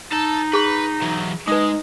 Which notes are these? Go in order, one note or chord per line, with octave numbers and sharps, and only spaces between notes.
D#4 A4 A5
G#4 B4 C#6
E3 F#3
G#3 D#4 B4 D#6